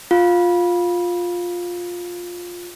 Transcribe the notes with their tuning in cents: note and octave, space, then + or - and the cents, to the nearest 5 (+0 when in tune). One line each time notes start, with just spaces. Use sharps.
F4 +10